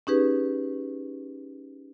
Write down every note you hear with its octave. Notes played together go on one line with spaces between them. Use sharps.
C#4 D#4 G4 G#4 B4